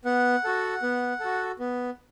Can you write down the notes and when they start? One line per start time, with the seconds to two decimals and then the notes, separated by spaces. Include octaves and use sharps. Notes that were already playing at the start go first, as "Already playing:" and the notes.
0.05 B3 F#5
0.45 F#4 A4
0.82 B3
1.20 F#4 A4
1.59 B3